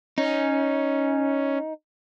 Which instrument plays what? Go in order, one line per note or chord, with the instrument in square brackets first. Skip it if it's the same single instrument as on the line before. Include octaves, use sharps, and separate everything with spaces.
[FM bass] C#4 [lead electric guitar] D#4